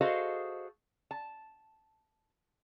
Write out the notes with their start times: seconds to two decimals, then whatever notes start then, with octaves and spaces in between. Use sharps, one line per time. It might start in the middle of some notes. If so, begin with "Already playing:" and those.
0.01 F#4 G#4 A4 C5 D#5 F5
1.11 A5